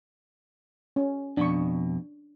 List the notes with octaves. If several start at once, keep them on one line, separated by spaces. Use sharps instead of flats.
C#4
F2 B2 D4 C#6